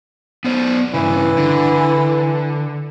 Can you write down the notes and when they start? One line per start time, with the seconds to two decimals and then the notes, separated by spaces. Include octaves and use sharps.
0.44 B3 C5 D5
0.94 G2 C#3 E3
1.37 D3